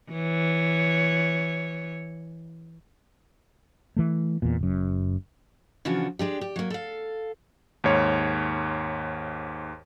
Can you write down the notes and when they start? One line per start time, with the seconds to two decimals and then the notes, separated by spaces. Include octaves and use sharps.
0.12 E3 C#5
3.96 E3 A3
4.42 E2 A#2
4.59 F#1 F#2
5.85 C#3 E3 F3 D4 F4 F#4
6.19 G#3 D4 G4
6.41 G4
6.56 F#3 A#3
6.70 A4 F5
7.84 D#2 G#2 C#5